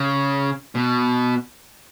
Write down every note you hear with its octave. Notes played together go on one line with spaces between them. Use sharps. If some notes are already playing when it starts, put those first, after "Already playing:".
Already playing: C#3
B2